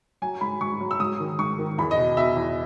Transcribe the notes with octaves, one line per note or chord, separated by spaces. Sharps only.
F#3 G#5
G#2 B5
G#2 C#6
F#3
E6
G#2 D#6
D#3
G#2 C#6
D#3
E2 B5
D#5
B2
B2 E5
E2